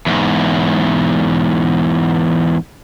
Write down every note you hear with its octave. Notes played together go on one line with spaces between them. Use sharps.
E2 G#2